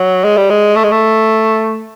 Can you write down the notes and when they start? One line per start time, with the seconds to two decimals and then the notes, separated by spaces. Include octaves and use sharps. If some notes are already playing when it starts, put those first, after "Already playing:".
Already playing: F#3
0.24 G#3
0.37 G3
0.50 G#3
0.76 A3
0.84 G#3
0.92 A3